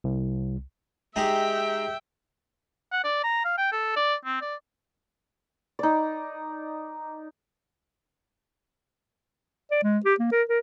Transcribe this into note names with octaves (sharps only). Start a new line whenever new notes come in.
C2
G#3 D#4 G4 E5 G5
F#5
D5
A#5
F5
G5
A4
D5
C4
D5
D#4 D5
D5
G#3
G4
A#3
A#4
A#4